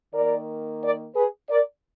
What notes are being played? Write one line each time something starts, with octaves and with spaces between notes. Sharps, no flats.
D#3 A#3 A#4 D5
A#4 D5
G#4 B4
A#4 D5